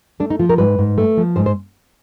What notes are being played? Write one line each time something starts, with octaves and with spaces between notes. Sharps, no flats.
A3 D4
D#4
F3 F4
A#4
G#2 B4
G#2
A3
F3
G#2 C5
C5